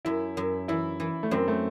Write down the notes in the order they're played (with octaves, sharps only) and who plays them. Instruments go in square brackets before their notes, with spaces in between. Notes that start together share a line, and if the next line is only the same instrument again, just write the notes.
[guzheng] F#2 [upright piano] E4
[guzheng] F#2
[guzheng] E3 [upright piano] E4
[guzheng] E3
[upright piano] A3
[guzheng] F#2 [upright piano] C4
[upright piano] A3